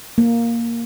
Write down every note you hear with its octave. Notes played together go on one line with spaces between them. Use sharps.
A#3